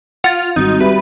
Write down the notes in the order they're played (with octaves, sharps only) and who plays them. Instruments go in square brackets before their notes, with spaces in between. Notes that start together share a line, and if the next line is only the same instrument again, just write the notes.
[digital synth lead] F4 [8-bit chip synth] F#5 A6
[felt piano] G#1 [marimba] G3 C4 F#4 [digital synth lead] D#4
[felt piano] G3 [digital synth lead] B4 [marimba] E5